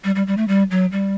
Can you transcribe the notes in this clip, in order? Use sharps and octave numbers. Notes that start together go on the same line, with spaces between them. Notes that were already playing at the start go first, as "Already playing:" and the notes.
G3
G3
G3
A3
G3
F#3
G3